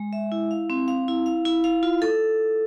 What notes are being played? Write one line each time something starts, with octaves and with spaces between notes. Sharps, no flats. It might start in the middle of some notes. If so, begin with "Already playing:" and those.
Already playing: G#3
E5
E4
F5
C4
F5
E4
F5
E4
F5
F4
A4